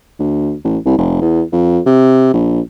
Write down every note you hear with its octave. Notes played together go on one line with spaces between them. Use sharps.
D2
A1
C2
F1
E2
F2
C3
A#1